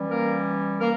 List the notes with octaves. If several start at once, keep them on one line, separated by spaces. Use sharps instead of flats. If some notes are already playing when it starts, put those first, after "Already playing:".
Already playing: E3 G3 C#4
A#3 A#4
A#3 A#4